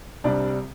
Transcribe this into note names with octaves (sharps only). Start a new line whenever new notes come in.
C2 C3 G3 D4